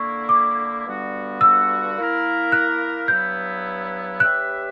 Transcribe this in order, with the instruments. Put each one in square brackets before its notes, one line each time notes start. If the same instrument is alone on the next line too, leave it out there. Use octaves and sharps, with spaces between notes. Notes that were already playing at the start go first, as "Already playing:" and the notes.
Already playing: [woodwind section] D3 A#3 E4 [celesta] C#6
[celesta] D6
[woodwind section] G2 D3 G3 B3 F#4
[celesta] E6
[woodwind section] A#3 E4 A#4
[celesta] F#6
[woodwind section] G2 F#3 B3 E4 [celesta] G6
[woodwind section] G3 C#4 G4 B4 E5 [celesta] F#6